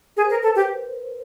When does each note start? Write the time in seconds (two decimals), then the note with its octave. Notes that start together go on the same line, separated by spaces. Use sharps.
0.17 G#4 A#4
0.25 C5
0.29 A#4 B4
0.42 A4 C5
0.55 G4 C5